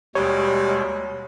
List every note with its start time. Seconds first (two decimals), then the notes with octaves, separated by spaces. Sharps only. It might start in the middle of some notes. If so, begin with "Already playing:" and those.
0.15 D#2 B2 G3 G#3 C#5